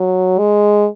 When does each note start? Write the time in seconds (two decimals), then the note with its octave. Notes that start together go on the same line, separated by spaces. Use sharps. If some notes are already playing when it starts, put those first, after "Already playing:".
Already playing: F#3
0.38 G#3